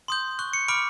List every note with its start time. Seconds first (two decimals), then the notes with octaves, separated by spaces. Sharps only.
0.08 C6 D#6 G6
0.39 C#6 F#6
0.53 C#7
0.68 B5 D6 F6 D7